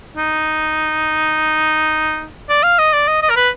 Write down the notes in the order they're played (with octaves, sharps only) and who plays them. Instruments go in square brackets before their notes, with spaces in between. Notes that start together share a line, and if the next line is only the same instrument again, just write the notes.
[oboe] D#4
D5
F5
D#5
D5
D#5
D#5
A#4
B4